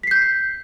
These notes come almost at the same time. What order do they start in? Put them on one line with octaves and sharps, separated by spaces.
B6 C7 G6